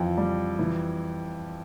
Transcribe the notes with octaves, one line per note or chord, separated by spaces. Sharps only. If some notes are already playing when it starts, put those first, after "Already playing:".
Already playing: F2 E3
G3
E3